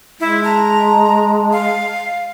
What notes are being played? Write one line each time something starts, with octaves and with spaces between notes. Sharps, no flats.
G#3 E4
A5 A#5
F5